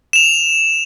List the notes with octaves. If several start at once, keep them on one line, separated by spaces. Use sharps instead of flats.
E7 F7